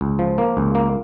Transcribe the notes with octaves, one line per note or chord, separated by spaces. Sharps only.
C#2
F3
A#3
C#2
A#3